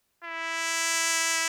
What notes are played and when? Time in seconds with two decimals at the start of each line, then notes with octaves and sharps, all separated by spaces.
0.24 E4